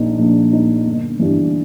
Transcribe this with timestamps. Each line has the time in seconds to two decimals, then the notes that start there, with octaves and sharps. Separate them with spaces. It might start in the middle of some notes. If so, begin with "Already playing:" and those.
Already playing: A#1 A#2 A#3 D#4
0.19 A#1
0.53 A#2 A#3 D#4
0.86 G1
1.19 G2 E3